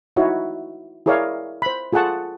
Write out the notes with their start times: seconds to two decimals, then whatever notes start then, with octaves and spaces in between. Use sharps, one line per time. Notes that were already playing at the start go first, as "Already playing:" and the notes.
0.16 D#4 E4 F#4 C#5
1.06 E4 G#4 A#4 C#5 D5 F5
1.62 C5 B5
1.93 F4 G#4 A4 F#5 A5 C#6